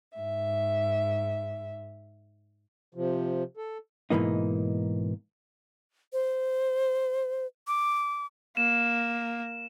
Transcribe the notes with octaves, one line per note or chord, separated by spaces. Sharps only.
G#2 E5
C3 F3
A4
G#2 B2 E3 A#3 D#4
C5
D6
A#3 E7